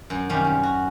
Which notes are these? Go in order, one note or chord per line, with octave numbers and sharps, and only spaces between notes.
F#2
F#2 C3 D#3 G3 C#4
C#4
F#4